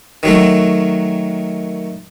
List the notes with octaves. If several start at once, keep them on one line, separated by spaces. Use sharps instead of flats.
D#3 F#3 A3